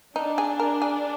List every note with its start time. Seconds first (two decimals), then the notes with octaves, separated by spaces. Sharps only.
0.16 D4 D#4
0.38 G#4
0.60 A#4
0.82 G#4